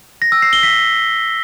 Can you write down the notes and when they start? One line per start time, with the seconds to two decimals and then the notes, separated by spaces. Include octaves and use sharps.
0.22 A#6
0.32 E6
0.42 C7
0.53 G7
0.63 B6